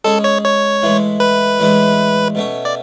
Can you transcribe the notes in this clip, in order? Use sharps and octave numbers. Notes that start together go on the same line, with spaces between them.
G#3 C#4 G#4 A4
C#5
C#5
A2 E3 G#3
B4
A2 E3 G#3 D4
B2 A3 C#4
D5